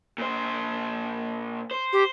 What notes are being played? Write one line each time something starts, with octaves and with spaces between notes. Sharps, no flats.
A#2 C5
C5
G4